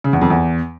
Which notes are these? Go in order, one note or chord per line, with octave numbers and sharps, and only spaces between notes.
C#3
E2
F2
E2